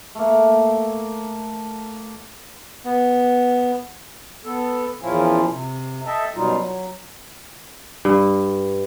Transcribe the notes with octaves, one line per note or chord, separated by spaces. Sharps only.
A3 A#3
B3
B3 A4
E2 A#2 F3 C#4 E4 F4
C3
A4 D#5 E5 G5 A5
F#2 B2 F#3 G3 D#4 F4
F#3
G2